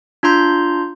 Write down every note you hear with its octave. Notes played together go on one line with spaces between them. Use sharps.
D4 F4 A#5 C6 G6